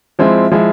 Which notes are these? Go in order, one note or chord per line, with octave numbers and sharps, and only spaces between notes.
F3 G#3 C4 E4
F3 G#3 E4